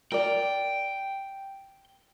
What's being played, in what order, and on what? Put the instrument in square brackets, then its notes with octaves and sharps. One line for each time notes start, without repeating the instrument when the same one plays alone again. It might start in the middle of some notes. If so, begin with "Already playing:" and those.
[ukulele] A#4 D5 [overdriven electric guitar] G5